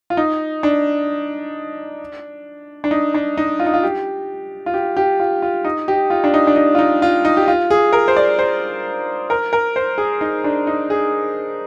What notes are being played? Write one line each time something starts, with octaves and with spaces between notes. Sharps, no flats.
F4
D#4
D4
D4
D#4
D4
D#4
F4
D#4
F4
G4
F4
G4
G4
F4
F4
D#4
G4
F4
D4
D#4
D4
D#4
F4
D#4
F4
D#4
G4
F4
G#4
A#4
C5
D5
C5
A#4
A#4
C5
G#4
D#4
D4
D#4
G#4